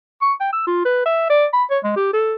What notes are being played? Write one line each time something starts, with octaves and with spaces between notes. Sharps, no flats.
C#6
G5
E6
F4
B4
E5
D5
B5
C#5
G#3
G4
A4